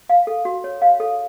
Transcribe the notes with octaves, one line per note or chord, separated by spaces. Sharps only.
F5
A4
F#4
C#5
F5
A4